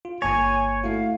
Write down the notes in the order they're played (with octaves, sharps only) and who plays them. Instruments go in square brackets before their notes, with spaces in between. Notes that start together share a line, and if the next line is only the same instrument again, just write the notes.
[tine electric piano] F4
[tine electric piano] G1 A#3 A5 [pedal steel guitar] C#5 [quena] G#5
[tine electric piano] A3 E4 F#4 [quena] F5